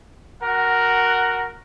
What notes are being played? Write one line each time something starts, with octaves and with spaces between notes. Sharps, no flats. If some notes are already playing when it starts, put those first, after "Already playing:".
F#4 A#4 F#5